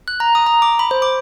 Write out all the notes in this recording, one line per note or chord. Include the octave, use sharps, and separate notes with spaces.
F#6
A#5
D#6
A#5
D6
B5
C5
D6